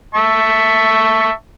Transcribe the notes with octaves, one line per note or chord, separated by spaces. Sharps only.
E5 A5 C#6